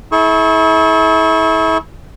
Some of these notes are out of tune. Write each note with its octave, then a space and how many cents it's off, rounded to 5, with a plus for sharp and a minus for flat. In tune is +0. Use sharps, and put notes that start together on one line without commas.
E4 -30 A4 -40 C#6 -20